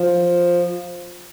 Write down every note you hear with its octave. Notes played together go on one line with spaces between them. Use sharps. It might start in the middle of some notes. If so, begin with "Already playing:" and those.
Already playing: F3